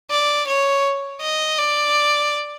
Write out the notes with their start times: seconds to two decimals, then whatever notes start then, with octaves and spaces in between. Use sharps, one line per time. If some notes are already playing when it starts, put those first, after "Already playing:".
0.10 D5
0.47 C#5
1.22 D#5
1.58 D5